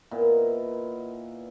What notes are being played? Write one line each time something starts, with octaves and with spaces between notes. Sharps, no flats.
A#2 B3 E4 D#5